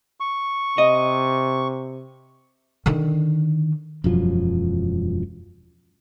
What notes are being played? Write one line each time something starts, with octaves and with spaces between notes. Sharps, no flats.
C#6
C3 D#5
D3 D#3
E1 F#2 F3 F#3